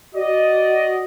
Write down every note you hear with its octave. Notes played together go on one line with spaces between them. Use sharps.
F#4 D5 D#5